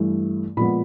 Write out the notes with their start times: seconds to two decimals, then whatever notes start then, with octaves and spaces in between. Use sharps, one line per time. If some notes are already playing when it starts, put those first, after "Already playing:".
Already playing: G2 E3 A3
0.57 A#2 F3 G#3 B3 B5